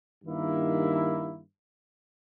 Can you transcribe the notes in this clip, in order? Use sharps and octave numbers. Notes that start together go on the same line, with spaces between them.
G2 D#3 A#3 E4